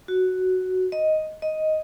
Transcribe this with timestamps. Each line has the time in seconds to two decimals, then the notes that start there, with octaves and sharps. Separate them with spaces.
0.08 F#4
0.92 D#5
1.42 D#5